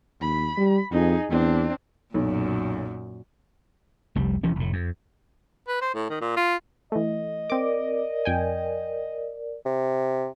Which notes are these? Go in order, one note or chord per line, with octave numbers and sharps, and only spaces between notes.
D#2 B5
G3
F2 D#4 G#4
E2 C4 D4
B1 F#2 A#2
F1 C2 G3
E1 E3 F3 C#4
F1 A2
F2
B4
C5
A2
D#3
A#2
F4
E3 A3 D#5
C4 A#4 D5 D6
F2 G5 G#5
C3